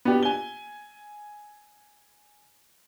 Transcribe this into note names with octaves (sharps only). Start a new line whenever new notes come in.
B3 D4 G4
G#5 G7